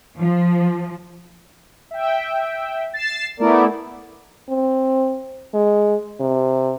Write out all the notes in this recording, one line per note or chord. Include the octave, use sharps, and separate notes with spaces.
F3
E5 G5
A6 C7 E7
A3 B3 E4 A#4 D5
C4
G#3
C3